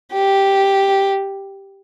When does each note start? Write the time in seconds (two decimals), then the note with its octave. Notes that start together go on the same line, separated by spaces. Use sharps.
0.13 G4